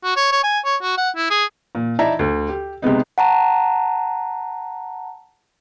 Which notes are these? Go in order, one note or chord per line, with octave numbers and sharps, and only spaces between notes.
F#4
C#5
C#5
G#5
C#5
F#4
F#5
E4
G#4
A#2
D#4 E4 D5 E5 A5 A#5
D2
G4
C3 G#3 B3 D#4
F#5 A5 A#5